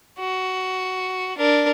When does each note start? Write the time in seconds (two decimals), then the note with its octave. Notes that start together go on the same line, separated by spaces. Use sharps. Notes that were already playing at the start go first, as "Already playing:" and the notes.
0.19 F#4
1.38 D4 A#4